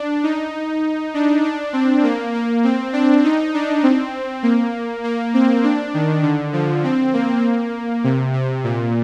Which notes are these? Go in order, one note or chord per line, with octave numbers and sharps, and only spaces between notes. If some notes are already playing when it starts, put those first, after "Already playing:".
Already playing: D4
D#4
D4
D4
C4
A#3
A#3
C4
D4
D#4
D4
C4
A#3
A#3
C4
D4
D#3
D3
F3
C4
A#3
C3
C3
A#2